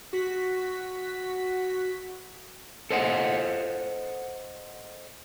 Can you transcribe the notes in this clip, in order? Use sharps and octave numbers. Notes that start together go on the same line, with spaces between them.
F#4 B6
A4 C5 D#5 F#5